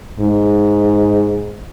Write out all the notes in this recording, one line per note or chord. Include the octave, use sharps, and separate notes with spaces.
G#2